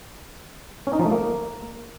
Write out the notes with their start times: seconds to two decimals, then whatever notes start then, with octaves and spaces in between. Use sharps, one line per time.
0.87 C#4
0.93 D#4
0.99 F3
1.05 A3
1.12 A#3